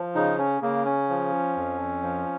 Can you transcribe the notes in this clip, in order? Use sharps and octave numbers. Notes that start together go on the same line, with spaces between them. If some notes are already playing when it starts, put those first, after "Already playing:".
Already playing: F3
C#3 D#4
C#4
C#3 A#3
C#4
F3
F2
F3